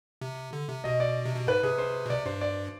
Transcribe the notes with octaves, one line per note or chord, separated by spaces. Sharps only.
C3
D3
C3
B2 D#5
D5
C3
B2
G#2 B4
C3 G#4
C5
B2
C3 D5
G2 C5
D5